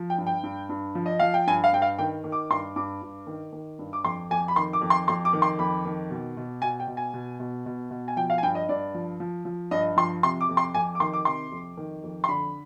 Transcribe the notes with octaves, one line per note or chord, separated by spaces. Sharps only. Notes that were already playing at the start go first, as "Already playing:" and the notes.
Already playing: F3
G5
G2
G5
G2
G2
F3
D#5
F3 F5
G5
G2 G#5
F5
G2 G5
F5
D#3 G5
D#3
D6
G2 C6
G2 D6
G2
D#3
D#3
G2
D6
F2 C6
F2 G#5
B5
D#3 C6
D6
F2
C6
F2 C6
D6
D#3
C6
F2 B5
D#3
B2
B2
B2 G#5
G5
B2
G#5
B2
B2
B2
B2
G#5
F3 G5
F5
G#5
G2 G5
D#5
G2 D5
F3
F3
F3
G2 D#5
F3 C6
C3 C6
D6
F2
C6
F2 G#5
D6
D#3 C6
D6
C3 C6
F2
D#3
F2
C6
D3 B5